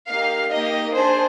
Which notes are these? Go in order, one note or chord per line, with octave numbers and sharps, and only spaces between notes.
A#3 D#4 G4 F5
A#3 D#4 G4 D#5
D4 G#4 C5